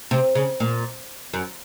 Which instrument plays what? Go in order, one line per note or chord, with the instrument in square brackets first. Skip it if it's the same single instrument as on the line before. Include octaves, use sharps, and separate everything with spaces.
[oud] C3
C#3
A#2
F#2